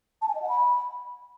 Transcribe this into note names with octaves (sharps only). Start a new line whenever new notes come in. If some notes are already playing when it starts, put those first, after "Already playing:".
A5
G#5
D#5
F#5
B5